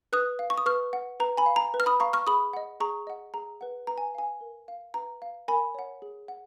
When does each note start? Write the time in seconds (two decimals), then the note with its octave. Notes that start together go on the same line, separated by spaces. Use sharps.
0.13 B4 D#6 F#6
0.39 F5
0.50 C#6
0.58 D#6
0.66 B4 C#6 F6
0.93 F#5
1.20 B4 A#5
1.37 G#5 B5
1.46 F5
1.56 A#5
1.74 B4
1.80 F6
1.86 B5 D#6
2.00 F5 A#5 C#6
2.13 C#6 F6
2.27 G#4 B5 D#6
2.53 D#5 F#5
2.80 G#4 A#5 C#6
3.07 D#5 F#5
3.34 G#4 A#5
3.61 B4 F#5
3.87 B4 A#5
3.98 G#5
4.15 F5 G#5
4.41 A#4
4.68 F5
4.94 B4 A#5
5.22 F5
5.48 A#4 G#5 B5
5.75 C#5 F#5
6.02 G#4
6.28 F#5